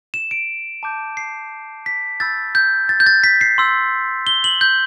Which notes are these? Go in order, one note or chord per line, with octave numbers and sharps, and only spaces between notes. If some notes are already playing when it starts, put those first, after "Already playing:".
E7
D7
A5 D6 G6
C7
B6
B5 E6 G6 A6
G6
A6
G6
A6
B6
C7
C6 E6 G6
G7
F#7
G6